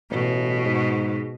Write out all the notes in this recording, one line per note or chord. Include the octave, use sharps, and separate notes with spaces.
A1 B2
G#2